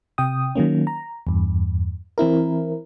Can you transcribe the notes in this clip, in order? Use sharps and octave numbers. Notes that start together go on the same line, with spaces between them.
C3 G5 D#6
D#3 F#3 A#3 C#4
A#5
E2 G2
E3 C4 E4 A#4